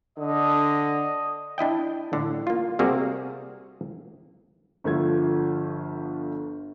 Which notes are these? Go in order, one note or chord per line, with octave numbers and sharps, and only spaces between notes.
D3 D#5
D4 E4 D#5 G5
A2 D3
A#3 F4
C3 G3 A#3 F#4 G#4 A#4
G1 F3 A3 F4 G#6